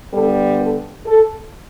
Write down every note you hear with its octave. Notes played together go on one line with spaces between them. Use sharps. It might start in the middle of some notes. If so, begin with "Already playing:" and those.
D3 G3 B3 A4
A4
A4